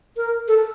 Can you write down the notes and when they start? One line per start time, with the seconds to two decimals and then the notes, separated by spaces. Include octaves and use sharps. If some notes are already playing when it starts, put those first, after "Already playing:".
0.17 A#4
0.48 A4